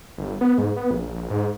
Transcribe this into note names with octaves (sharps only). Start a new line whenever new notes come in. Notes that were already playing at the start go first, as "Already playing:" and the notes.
G1
B3
G#2
B3
A#1
G#2